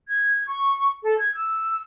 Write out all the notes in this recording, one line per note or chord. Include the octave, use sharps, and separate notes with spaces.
G#6
C#6
A4
G#6
E6